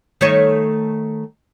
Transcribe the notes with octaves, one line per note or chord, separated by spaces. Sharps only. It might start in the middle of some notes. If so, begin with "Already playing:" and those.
D#3 A3 C#5